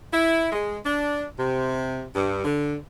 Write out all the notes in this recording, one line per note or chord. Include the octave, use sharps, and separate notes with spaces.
E4
G#3
D4
C3
G2
D3